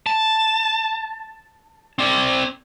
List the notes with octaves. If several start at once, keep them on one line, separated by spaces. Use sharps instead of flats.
A5
C4 D5